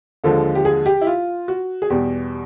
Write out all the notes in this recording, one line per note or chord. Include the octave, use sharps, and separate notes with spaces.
D#2 D3 F3 G#3 A4
G4
G#4
G4
E4
F4
F#4
G#4
E2 B2 G3 G4